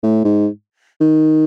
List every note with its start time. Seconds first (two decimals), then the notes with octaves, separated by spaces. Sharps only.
0.03 A2
0.24 G#2
1.01 D#3